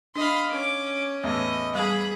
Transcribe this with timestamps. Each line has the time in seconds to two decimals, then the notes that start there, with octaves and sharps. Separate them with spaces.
0.16 D4 D#5 F5 B5 C6
0.51 C#4 D6
1.24 E2 A2 D#5
1.75 G3 G#4 B5